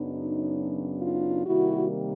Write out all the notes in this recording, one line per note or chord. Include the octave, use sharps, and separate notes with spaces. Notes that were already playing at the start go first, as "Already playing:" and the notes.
Already playing: F#2 C#3 F#3 B3 D4 D#4
D#4 F4
C3 D#3 G3 A#3 E4 F#4